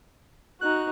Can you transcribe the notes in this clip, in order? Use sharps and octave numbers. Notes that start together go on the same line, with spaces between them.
D#4 F#4 F#6